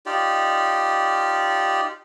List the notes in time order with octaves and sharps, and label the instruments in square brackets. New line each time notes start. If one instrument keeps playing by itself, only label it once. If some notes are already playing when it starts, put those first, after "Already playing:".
[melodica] D#4 F4 G4 D5